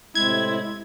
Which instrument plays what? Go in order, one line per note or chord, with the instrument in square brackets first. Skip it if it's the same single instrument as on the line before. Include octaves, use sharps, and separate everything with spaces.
[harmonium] A2 C3 C4 [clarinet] G#3 [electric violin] E4 [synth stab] G#6